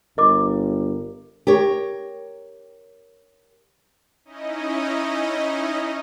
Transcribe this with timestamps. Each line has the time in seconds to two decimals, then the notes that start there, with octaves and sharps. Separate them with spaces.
0.18 G1 A#4 D#5 D6
1.47 G4 A#4 C#5
4.25 C#4 D#4 E4 D#5